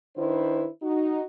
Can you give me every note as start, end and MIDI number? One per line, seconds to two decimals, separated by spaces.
0.17 0.67 51
0.17 0.67 62
0.17 0.67 64
0.17 0.67 71
0.17 0.67 72
0.82 1.24 63
0.82 1.24 66